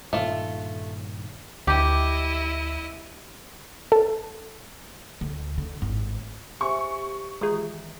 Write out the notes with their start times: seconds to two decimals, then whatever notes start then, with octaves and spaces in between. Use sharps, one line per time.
0.13 G2 A#2 D#3 A3 F4
1.67 D2 E4 G4 D#5
3.92 A4
5.21 D2 D3
5.58 D3
5.82 G#1 A2
6.61 G4 C5 E5 G#5 C#6
7.41 D#3 E3 G#3 F4 G#4 A#5